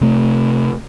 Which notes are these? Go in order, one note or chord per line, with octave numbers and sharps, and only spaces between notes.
C3 A3